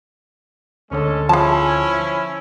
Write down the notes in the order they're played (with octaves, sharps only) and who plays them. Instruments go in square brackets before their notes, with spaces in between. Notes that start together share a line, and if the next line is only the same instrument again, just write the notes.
[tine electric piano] D2 D3 C#5 [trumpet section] G#3 C#4 A4
[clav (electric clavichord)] F3 [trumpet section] C#4 E4 [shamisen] G#4 A5